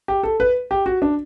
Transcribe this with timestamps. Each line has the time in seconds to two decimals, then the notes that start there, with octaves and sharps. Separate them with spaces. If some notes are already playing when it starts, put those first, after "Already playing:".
0.08 G4
0.23 A4
0.40 B4
0.71 G4
0.86 F#4
1.02 D4